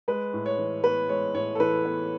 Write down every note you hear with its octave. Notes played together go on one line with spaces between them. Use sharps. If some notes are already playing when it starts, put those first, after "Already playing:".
G#3 B4
A2
C#5
E3
B3 B4
G#3 C#5
A2 C#5
A4
E3 B4
B3